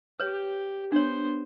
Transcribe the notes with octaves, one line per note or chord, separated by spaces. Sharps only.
G4 B4 C#5
B3 D4 C5 C#5